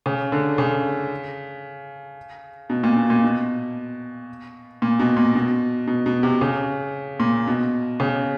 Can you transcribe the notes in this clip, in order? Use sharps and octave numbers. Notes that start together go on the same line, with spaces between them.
C#3
D3
C#3
B2
A#2
B2
A#2
B2
A#2
B2
A#2
B2
B2
B2
C3
C#3
A#2
B2
C#3